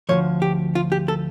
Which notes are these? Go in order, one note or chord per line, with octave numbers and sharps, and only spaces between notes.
D2 C#3 F3 C#5
G4
F4
G4
A4